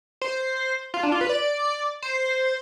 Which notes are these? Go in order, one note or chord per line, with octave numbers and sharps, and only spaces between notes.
C5
F4
D4
F4
B4
D5
C5